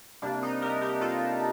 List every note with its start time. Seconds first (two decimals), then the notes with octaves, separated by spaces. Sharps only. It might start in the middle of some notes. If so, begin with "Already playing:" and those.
0.22 C3 G3 A#3 D4
0.43 D#4
0.62 G4 A#4
0.82 G4 A#4
1.01 F4 A4